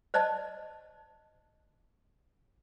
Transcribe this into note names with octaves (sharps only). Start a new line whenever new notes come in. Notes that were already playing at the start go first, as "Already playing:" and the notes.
C5 D5 D#5 A5